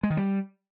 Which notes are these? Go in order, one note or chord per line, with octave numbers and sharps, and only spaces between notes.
G#3
D#3
G3